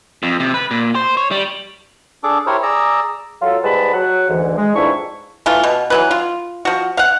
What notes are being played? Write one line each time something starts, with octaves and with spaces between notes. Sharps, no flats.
F2
C3
B4
A#2
C5
C#5
G3
D4 G#4 A4 D6
E4 G4 A#4 C5 C#5
G#4 D5 A#5 E6
F#3 F4 A4
G#2 G3 G#3 B4 A5 B5
F#3 F#5
D2 G#2 E3
G#3
F2 G#2 E3 D4 E4 C#6
E3 A3 F4
B2
E3 F#3 B4
F4
F3 F#4
F5 F#5